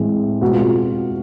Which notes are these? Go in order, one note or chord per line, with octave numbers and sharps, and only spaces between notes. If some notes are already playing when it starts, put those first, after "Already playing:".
Already playing: A2 E3 G#3 C4
B2 G#3 C4 F#4
F4